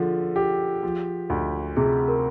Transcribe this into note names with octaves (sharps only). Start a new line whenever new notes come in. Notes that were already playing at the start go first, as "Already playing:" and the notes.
Already playing: D3 F3 G#4
G4
F3
D2
C3 G#4
A#4